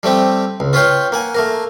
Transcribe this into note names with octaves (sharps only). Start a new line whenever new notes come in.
G3 A3 C4 G4
C#2
F4 B4 C#5 F5 G5
A#3 F#5 G#5
A3 A#3 A#4